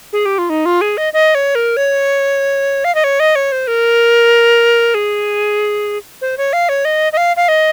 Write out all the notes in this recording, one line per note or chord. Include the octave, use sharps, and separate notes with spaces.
G#4
G4
F4
D#4
F4
G#4
D#5
D#5
C#5
A#4
C#5
F5
D#5
C#5
D#5
C#5
C5
A#4
G#4
C5
C#5
F5
C#5
D#5
D#5
F5
F5
D#5